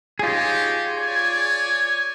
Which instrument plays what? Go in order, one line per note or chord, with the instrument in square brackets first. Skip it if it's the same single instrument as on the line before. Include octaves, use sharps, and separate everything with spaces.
[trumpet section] D#4 G4 C#5 [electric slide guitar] F4 G#4
[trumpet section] C#5 D5 G#5